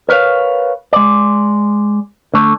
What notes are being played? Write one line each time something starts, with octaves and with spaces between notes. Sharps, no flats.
A#4 B4 C#5 F5
G#3 D5
D3 A3